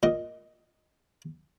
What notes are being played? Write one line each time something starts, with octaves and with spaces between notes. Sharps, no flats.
A#2 D#5